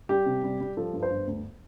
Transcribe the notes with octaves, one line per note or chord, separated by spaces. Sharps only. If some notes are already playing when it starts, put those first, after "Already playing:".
G3 G4
C3
G3
G3
F3 A4
G2
C5
G1
D2